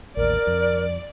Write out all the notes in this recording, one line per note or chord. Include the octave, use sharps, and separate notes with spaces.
A1 D#2 A#4 D5
F2